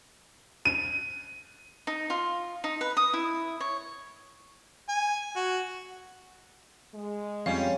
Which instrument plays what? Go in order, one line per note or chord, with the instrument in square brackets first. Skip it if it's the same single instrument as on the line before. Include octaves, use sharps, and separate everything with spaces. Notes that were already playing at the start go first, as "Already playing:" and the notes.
[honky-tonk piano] D#7
[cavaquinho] D#4
F4
D#4
B4
D#6
E4
C#5
[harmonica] G#5
F#4
[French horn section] G#3
[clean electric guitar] F2 G3 [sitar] C#4 [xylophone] F5